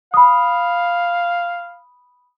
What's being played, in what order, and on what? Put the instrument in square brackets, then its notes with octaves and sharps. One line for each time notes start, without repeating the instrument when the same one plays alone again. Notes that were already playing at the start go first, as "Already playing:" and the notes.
[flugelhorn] F5 [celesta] B5 D#6